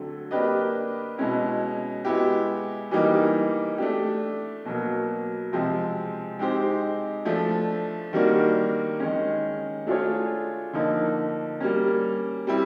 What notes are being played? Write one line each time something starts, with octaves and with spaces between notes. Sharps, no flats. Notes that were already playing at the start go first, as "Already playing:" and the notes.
Already playing: D3 F#3 A3 C4
A#3 D4 G4 B4 D#5
B2 G#3 C#4 E4
G#3 B3 E4 G4
E3 G3 A#3 D#4 G4
A3 D4 G4
B2 F#3 A#3
C3 F3 G#3 C4
G#3 C4 D#4 G4 C5
F3 A3 D4
D#3 G3 A#3 D4 F#4
D#3 G#3 C#4
A3 D4 F4 G#4 C#5
D3 F3 A#3 D#4
G3 A#3 C#4
G3 C4 E4